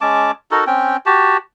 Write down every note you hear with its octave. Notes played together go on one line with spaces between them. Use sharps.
G#3 C#4 A5 D6
D#4 F#4 A4 A#4
C4 C#4 G5
F#4 G4 A5